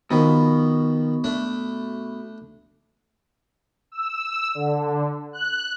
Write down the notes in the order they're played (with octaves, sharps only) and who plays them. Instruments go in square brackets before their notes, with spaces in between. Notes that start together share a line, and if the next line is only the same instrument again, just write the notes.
[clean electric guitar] B2 [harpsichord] D#3 F3
[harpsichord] A3 D4
[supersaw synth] E6
D3
F#6